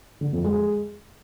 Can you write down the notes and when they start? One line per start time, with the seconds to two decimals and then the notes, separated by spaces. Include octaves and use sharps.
0.21 D3
0.33 F2
0.44 G#3